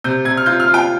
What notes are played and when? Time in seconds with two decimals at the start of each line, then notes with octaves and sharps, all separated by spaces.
0.04 C3 G6
0.25 C3 G#6
0.37 F6
0.46 F4 G6
0.60 F6
0.68 F4
0.74 G5